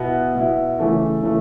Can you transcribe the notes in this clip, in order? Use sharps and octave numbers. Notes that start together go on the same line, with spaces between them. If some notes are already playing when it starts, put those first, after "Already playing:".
Already playing: B2 B3 E4
B2 B3 E4
C#3 E3 A3
C#3 E3 A3